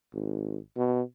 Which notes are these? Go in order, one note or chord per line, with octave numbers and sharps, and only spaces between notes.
G#1
B2